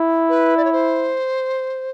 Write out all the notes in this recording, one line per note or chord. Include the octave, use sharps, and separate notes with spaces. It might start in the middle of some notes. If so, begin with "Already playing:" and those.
Already playing: E4
B4
D5
C#5
C5